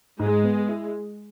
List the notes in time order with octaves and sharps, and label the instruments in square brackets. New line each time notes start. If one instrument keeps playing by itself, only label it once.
[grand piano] G#2 [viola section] G#3
[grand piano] B3
E4